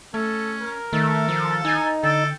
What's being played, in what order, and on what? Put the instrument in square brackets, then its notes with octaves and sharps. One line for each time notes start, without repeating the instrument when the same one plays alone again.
[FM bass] A3 [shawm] C#4 [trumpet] A4
[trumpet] A#4
[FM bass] D#3 [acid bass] A3 [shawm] A4
[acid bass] F3
[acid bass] D#4 [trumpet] G#5
[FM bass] D3 [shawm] A4 [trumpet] G5